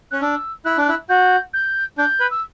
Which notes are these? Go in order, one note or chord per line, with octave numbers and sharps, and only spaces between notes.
C#4 F#6
D4 E6
E4 F#6
D4
E4
F#4 G6
G6
D4 G6
B4
E6